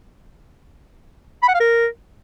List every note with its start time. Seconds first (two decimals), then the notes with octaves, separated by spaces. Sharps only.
1.43 B5
1.49 F#5
1.54 F5
1.60 A#4